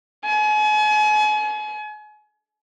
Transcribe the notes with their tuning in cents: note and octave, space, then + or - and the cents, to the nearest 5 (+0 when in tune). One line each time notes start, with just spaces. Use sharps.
G#5 +40